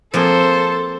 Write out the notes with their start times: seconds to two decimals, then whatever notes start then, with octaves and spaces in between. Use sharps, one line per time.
0.14 F3 A#3 C4 G#4 A4 C5